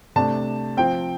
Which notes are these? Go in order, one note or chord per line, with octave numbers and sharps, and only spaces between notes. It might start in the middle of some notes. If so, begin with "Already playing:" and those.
C3 A3 D4 A5
F3 C4 G5